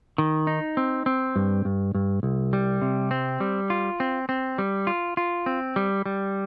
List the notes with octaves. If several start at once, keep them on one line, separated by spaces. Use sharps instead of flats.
D#3
D#4
C4
C4
G2
G2
G2
C2
G3
C3
C4
G3
F4
C4
C4
G3
F4
F4
C4
G3
G3